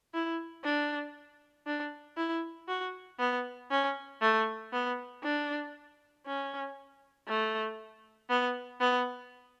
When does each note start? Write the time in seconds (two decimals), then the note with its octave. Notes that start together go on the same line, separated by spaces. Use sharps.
0.14 E4
0.64 D4
1.66 D4
2.17 E4
2.68 F#4
3.19 B3
3.71 C#4
4.21 A3
4.73 B3
5.23 D4
6.26 C#4
7.28 A3
8.29 B3
8.80 B3